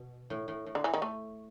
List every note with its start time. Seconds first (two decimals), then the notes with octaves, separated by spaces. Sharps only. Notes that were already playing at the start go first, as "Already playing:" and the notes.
Already playing: B2
0.30 A2
0.48 A2
0.66 A2
0.75 D3
0.84 E3
0.94 D#3
1.02 A3